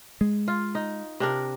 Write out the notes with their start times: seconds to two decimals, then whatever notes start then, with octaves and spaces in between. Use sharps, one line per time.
0.21 G#3
0.48 F4
0.75 D#4
1.20 C3 D4 A#4